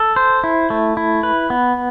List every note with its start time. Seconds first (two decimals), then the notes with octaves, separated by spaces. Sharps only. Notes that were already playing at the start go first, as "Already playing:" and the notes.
Already playing: A4
0.16 C5
0.44 E4
0.70 A3
0.97 E4
1.23 B4
1.50 B3